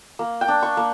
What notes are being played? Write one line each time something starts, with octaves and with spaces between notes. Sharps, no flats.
A#3
G5
D4
C#6
A#3